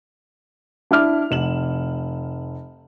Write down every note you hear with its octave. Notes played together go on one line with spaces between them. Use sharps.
D4 E4 D6 F6
F1 E7 F#7